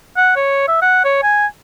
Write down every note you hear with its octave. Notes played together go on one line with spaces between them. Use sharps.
F#5
C#5
E5
F#5
C#5
G#5